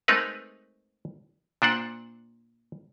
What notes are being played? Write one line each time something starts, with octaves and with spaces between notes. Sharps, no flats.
G#3 A3 C4 D#4 A#4 B4
A#2 D4 C5 F#5